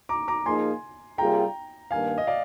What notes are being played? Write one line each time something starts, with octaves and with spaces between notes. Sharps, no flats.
A#5 D6
A#5 D6
F3 A#3 D#4 G#4 G#5 C6
C3 G3 A#3 F4 G#4 G5 A#5
G2 D#3 A#3 F5 G#5
D#5
D5 F5